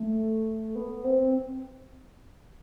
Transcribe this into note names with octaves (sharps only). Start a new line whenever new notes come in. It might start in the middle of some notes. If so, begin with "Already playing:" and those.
Already playing: A3
B3
C4